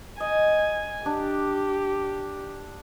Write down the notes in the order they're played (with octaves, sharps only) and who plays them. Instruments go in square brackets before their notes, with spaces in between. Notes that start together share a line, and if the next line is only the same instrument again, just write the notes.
[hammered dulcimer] D#5 [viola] G#5
[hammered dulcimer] D4 [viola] G4